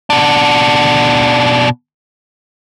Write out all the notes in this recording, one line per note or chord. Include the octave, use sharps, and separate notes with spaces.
B2 D4